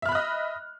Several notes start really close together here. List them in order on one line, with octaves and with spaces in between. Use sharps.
E5 F6 B5 F#6 D#5